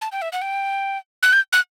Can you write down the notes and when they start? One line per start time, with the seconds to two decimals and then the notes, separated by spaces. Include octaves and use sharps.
0.01 A5
0.12 G5
0.22 E5
0.33 F#5
0.42 G5
1.23 F#6
1.33 G6
1.53 F#6